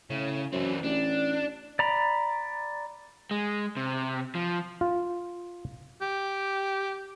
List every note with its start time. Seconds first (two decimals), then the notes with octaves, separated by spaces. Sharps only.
0.10 A2 C#3
0.53 F#2 E3 C4
0.84 A1 D4
1.79 D5 A#5 B5
3.31 G#3
3.77 C3
4.35 F3
4.81 F4
6.02 G4